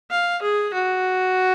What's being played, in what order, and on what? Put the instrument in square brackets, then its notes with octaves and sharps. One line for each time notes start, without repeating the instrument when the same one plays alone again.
[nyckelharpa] F5
G#4
F#4